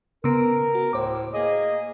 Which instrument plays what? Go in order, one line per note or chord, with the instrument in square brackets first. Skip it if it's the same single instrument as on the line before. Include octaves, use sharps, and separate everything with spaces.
[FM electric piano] C#3 B3 [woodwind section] A#4
[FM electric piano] F#4
[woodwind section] D2 A2 [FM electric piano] C5 D6
[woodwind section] A#3 G#4 D#5